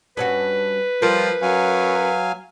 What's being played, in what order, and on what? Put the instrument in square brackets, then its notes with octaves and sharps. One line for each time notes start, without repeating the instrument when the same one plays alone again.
[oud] G2 C#4 F#4 [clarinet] B4
[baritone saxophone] F3 [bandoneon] G3 F4 [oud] A#4
[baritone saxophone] F#2 [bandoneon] F#3 F5 G#5